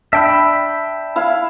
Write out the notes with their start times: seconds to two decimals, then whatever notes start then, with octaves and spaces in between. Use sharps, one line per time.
0.13 D4 E5 G5 B5
1.16 E4 F5